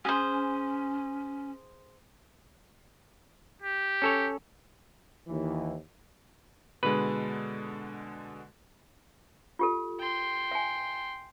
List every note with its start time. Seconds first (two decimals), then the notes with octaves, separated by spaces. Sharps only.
0.05 C#4 G#4 C5
3.62 G4
4.02 C#4 A4 C#5
5.28 D#2 E3
6.83 B2 D3 G#3 B4
9.59 F4 G4 A4
10.00 G5 C6
10.51 E5 G#5